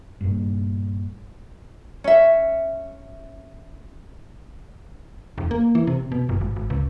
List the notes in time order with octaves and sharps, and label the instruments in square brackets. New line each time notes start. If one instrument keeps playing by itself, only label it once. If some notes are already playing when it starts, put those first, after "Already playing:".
[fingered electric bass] G2 A#2
[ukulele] C#4 E5
[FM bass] E1
A#3
E3
C3
B2
G1
G#1
G#1
C#2